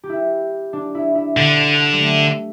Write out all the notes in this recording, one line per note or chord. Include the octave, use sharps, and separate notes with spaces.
G4
E4
D4
E4
E4
D3
G3
A3